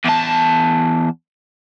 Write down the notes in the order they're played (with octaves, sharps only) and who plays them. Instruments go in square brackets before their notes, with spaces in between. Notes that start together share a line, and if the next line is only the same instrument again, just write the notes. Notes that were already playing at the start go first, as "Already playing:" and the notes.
[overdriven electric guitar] E2 A5